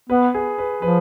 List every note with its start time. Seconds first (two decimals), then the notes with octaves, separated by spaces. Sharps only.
0.09 B3 B4
0.34 G#4
0.58 B4
0.82 F3 B4